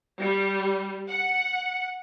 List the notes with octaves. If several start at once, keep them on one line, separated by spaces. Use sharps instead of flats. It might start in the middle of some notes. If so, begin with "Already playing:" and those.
G3
F#5